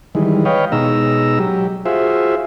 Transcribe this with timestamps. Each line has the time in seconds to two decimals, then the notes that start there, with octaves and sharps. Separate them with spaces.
0.15 D#3 E3 G3 G#3
0.45 B4 C#5 D#5 F5 G5
0.72 B2 G#3 D#4 A#5 E6
1.39 F#3 G4
1.86 F4 F#4 G#4 C5 E5